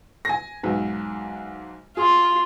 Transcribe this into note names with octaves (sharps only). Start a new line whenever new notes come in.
G#5 A#6
B1 G#2
F4 G#4